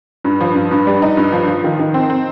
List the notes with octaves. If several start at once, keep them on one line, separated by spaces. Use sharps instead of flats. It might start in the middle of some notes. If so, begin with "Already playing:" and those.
G2
F3
G2
G2
G3
D#4
G2
F3
F3
D#3
D#3
C4
C4